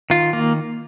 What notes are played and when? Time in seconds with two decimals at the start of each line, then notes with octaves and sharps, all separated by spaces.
0.10 D#3 F4
0.33 A#3